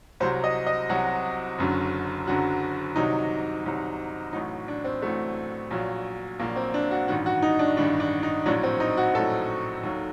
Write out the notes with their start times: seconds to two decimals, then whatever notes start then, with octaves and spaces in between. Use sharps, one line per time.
0.20 C2 C3 F#3 C5
0.44 D#5
0.67 D#5
0.89 C2 C3 F#3 F#4
1.58 F#1 F#2 D3 F#3
2.27 F#1 F#2 D3 F#3 F#4
2.96 C2 C3 D#3 F#3 D#4
3.65 C2 C3 D#3 F#3
4.33 A1 A2 F#3 D#4
4.68 D4
4.84 C4
5.02 A1 A2 F#3 A3
5.71 A#1 A#2 F#3
6.40 A#1 A#2 F#3 A#3
6.56 C4
6.74 D4
6.91 F#4
7.08 A1 G2 D#3 F#4
7.26 F#4
7.42 D#4
7.59 D4
7.77 A1 G2 D#3 D4
8.00 D4
8.23 D#4
8.45 A#1 A2 F#3 D4
8.63 C4
8.80 D#4
8.97 F#4
9.15 A#1 A2 F#3 A4
9.83 D#2 D#3 F#3